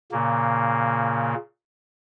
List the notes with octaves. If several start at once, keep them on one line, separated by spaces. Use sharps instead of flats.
A#2 C#3 A#3